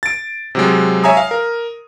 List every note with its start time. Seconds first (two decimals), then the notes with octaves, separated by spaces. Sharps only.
0.03 A6 D7
0.55 C3 F#3 G#3
1.04 C#5 E5 G#5 A#5 D#6
1.17 F5
1.31 A#4